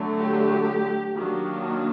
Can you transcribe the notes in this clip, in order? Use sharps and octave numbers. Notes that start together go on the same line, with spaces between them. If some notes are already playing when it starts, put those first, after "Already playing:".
Already playing: D3 F#3 A3
G4
D#3 F#3 A#3 D4